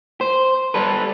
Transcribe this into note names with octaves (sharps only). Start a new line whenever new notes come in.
C5
G3 A4 B4